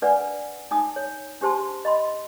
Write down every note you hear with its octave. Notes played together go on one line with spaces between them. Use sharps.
D4 B4 D5 F#5 G#5
D#4 G#5 D#6
C#5
D4 G4 C5 A5 C6
D#5 B5 C6